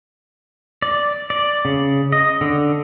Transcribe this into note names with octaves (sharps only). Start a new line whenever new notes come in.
D5
D5
C#3
D#5
D3